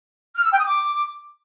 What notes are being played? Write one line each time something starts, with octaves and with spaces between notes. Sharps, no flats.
F6
E6
G5
D#6
D6